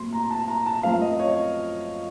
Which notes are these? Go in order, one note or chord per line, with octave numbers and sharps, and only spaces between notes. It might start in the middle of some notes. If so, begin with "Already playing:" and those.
Already playing: A#2 F#3 A3 C4 C6
A#5
A5
A#5
A5
F#2 F3 A3 C4 F5
D#5
C#5